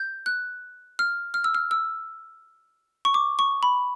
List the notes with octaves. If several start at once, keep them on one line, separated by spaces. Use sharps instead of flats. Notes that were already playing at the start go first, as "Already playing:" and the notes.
Already playing: G6
F#6
F6
F6
E6
F6
E6
C#6
D6
C#6
B5